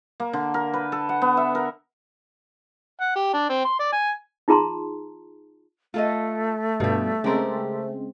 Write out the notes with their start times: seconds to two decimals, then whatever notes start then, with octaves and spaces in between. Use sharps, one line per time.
0.20 A#3
0.33 D3
0.54 A#4
0.74 B4
0.92 A4
1.09 F#5
1.22 B3
1.37 E5
1.55 A#4
3.01 F#5
3.16 G4
3.34 D4
3.49 C4
3.65 C6
3.80 D5
3.93 G#5
4.48 D#4 F4 G#4 A5 A#5 C6
5.94 A3 F4 A4 D#5
6.80 G2 B2 F3 G3
7.24 C#3 G#3 C4 G4 A#4